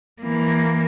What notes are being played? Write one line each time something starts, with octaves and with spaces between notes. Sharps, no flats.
E3 A#3